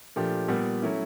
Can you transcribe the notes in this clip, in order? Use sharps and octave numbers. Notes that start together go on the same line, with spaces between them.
A#2 F3 A3 D4 G4
A#2 G3 B3
F#3 A3 C#4 E4